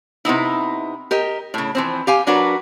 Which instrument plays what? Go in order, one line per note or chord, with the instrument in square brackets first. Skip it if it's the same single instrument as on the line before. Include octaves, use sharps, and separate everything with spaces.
[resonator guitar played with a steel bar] C3 B3 D#4 E4
G4 A#4 D#5
A2 C#3
E3 F3 C4
G4 F5 G#5
F#3 D4 F#4 A#4 B4